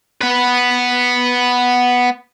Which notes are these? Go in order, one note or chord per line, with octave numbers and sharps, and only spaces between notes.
B3 B4